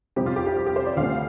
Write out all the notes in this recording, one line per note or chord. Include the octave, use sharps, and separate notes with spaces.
F2 C3 G3 C4 G4
F4
G4
G4
F4
G4
C5
D5
D2 D3 F3 A3 C4 F5